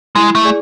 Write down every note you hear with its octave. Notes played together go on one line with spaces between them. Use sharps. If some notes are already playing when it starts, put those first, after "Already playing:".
G#3 E4
A3
G#4 D5 G#5